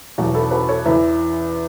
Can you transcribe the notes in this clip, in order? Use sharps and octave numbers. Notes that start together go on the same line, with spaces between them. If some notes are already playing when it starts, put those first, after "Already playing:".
E2 B2 F#3 F#4
E4 A4
F#4 B4
A4 C#5
E2 E3 B4 E5